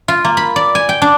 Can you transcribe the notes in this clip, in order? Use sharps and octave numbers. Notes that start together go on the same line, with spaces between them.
F4
A#3
B5
D5
G#5
G5
D4